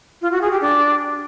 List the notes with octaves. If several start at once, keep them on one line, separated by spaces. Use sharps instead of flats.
F4
F#4
G#4
G4
D4